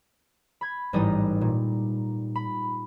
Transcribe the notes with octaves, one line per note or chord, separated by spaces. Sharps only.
B5 G#6
A1 G#2 G3 D#4 B4 D#6
A#2
B5